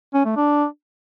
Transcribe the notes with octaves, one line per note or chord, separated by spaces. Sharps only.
C#4
A3
D4